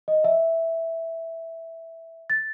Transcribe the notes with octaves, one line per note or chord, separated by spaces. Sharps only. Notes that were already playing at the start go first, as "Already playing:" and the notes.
D#5
E5
A6